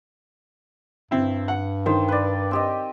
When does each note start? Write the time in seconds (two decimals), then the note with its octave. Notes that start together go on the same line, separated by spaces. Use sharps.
1.11 G2 C4 E4
1.48 F#5
1.86 D#3 C5 G5
2.08 B4 D5
2.51 C4 G4 D#5